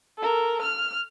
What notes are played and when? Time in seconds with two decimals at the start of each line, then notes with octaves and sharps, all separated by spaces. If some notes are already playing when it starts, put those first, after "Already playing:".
0.18 A4 A#4
0.62 F6